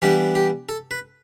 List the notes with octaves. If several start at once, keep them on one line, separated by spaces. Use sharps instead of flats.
E3 G3 B3 D4 G4
G4
A4
B4